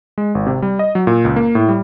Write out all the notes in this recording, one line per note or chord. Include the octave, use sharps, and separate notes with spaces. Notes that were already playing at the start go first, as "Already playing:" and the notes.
G#3
G#1
C3
G3
D#5
F#3
A#2
C#2
A#3
A2
G3